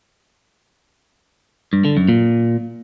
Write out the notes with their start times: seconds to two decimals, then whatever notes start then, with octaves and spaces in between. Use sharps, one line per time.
1.73 G2
1.85 D3
1.97 F#2
2.09 A#2